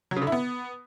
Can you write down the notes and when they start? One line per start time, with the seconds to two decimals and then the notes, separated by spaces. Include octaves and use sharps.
0.11 F#3
0.16 C#3
0.22 D3
0.27 E4
0.32 B3